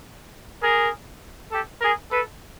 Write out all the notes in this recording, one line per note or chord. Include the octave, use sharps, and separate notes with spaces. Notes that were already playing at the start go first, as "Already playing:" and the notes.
G#4 A#4
G4 A4
G#4 A#4
A4 B4